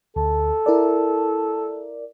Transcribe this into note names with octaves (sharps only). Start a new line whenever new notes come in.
D2 A4
E4 A#4 D5